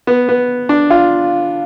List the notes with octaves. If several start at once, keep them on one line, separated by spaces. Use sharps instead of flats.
B3
B3
D4
F4